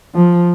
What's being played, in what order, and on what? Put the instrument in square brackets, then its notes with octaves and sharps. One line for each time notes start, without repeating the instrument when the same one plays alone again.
[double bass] F3